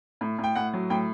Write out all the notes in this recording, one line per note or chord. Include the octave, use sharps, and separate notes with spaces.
A2
A2
G5
A2 F#5
F#3
A2 G5